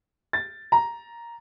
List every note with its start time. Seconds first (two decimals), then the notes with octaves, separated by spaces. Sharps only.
0.33 A6
0.72 A#5